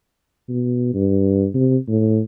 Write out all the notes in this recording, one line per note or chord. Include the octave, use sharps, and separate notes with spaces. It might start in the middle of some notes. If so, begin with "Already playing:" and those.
B2
G2
C3
A2